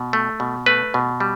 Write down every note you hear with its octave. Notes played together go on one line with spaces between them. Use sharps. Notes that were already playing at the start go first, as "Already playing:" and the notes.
Already playing: B2
A3
B2
A3 B4
B2
G3